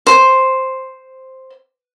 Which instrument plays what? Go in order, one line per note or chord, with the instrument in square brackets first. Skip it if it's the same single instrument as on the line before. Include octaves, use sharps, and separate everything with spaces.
[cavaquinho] C5